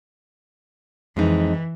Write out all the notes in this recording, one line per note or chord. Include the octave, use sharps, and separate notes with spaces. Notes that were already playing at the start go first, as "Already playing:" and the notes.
F2 E3 G#3 D#4